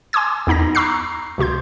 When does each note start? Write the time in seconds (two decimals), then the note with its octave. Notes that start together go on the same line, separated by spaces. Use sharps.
0.13 G#5 C6 D6 D#6 G#6
0.47 E2 B3 D#4 A#5 A#6
0.75 A#5 B5 C#6 E6 F#6 C7
1.38 C#2 C3 F#4 C6 G6